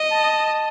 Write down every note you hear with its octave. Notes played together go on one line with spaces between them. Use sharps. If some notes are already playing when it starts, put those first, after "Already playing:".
Already playing: D#5
A5